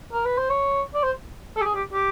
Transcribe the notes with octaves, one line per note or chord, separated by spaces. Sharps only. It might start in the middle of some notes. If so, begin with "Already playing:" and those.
A#4
B4
C5
C#5
D5
C5
A4
G4
G#4
G4
G4